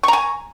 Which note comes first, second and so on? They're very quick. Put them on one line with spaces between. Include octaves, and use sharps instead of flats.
C#6 A#5 G#5